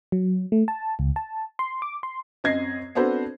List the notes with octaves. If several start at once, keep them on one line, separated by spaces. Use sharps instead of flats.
F#3
A3
A5
C#2
A5
C6
D6
C6
F#2 C4 D#5 G#6 A#6 C7
B3 C4 D4 F#4 A4 C5